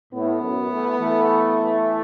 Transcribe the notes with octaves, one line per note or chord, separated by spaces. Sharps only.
A2 B3
F#2
E3 A3
E3 A3